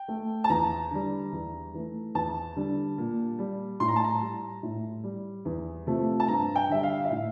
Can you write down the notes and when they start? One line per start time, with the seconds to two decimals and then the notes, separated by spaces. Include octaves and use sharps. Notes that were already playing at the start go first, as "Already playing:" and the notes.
Already playing: G5
0.08 A3
0.44 A5
0.50 E2 A#5
0.91 D3 G3
1.32 E2
1.74 E3 A3
2.15 E2 A5
2.56 D3 G3
2.98 A#2
3.39 G3
3.80 A2 C6
3.88 A#5
3.96 A5
4.04 A#5
4.21 G3
4.63 A2
5.04 G3
5.45 E2
5.87 C3 F3 A3
6.20 A5
6.28 G2 A#5
6.56 G5
6.69 D3 G3 E5
6.83 F5
7.05 E5
7.10 A2 F5